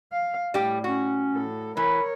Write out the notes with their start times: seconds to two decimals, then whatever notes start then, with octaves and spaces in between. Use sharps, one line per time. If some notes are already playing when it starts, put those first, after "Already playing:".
0.12 F5
0.54 A2 G3 G4
0.84 C#4 F#4
1.32 A2 A4
1.77 E3 A#4 C#5 B5